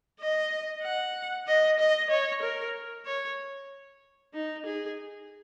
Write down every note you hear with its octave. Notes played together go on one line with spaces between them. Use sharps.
D#5
F#5
D#5
D#5
C#5
A#4
C#5
D#4
G#4